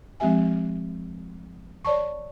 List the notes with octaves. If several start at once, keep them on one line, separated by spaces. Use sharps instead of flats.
F3 G#3 C4 G4 E5 G#5
C#5 D5 A5 C#6